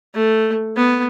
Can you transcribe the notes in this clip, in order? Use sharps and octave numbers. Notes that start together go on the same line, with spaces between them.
A3
B3